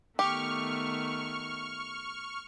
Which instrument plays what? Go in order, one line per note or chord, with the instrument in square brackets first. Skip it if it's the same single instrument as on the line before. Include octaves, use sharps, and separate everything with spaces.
[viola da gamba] D#3 A3 B3 [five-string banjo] G4 [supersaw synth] C#6 F6